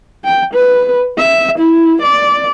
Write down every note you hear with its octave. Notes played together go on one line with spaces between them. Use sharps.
G5
B4
E5
E4
D5